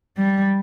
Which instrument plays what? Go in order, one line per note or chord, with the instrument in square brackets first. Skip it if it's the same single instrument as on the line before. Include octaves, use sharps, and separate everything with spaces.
[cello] G3